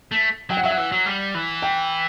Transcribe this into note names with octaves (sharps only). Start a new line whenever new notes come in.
A3
F#3 G5
F#5
F#3 E5
F#5
E3
F#3
G3
E3
G5